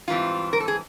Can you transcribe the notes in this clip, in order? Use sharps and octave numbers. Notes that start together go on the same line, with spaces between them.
G#2 E3 G3 C4 F4
A#4
A4
G#4